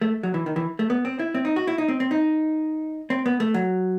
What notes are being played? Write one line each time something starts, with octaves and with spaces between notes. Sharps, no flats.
A3
F#3
E3
D#3
E3
A3
B3
C4
E4
C4
D#4
F#4
E4
D#4
C4
C4
D#4
C4
B3
A3
F#3